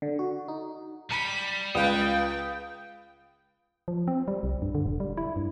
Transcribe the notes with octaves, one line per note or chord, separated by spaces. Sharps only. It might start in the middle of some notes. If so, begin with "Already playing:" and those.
D3
F#4
D#4
G3 B5 C#7 D#7
C#2 B4 F5 G5 D#6
F3
C4
G3
C2
G2
D3
E1
G3
E4
G2